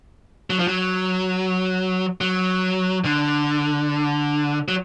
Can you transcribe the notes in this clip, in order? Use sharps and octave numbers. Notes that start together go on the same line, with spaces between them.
F#3
F3
F#3
F#3
D3
F#3